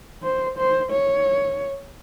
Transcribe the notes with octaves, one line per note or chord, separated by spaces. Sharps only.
C5
C5
C#5